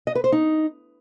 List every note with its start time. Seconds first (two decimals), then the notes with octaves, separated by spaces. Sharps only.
0.07 D#5
0.15 B4
0.24 C5
0.32 D#4